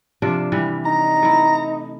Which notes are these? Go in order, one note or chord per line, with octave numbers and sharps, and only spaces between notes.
C3 F3 D4
C3 E3 G3
D#4 A#5
A3 E4